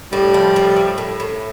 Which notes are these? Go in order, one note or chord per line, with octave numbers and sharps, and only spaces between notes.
A2 G3
F3
A2
A2
A2
A2